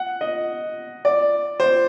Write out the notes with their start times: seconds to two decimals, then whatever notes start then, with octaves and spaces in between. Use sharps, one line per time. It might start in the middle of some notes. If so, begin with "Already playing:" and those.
Already playing: F#5
0.21 D#5
1.05 D5
1.60 C5